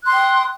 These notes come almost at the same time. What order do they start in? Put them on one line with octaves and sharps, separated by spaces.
F#6 C6 G5 D#6